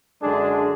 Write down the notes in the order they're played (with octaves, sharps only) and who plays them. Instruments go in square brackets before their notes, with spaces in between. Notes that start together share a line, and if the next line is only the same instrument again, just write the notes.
[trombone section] F#2 D3 G#3 D4 G#4